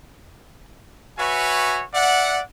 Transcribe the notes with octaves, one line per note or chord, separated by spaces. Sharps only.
F#4 B4 C#5 E5 G#5
D5 E5 F#5